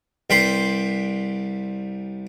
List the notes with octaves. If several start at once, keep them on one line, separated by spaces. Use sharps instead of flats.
C2 G3 B4 G5 B5 C6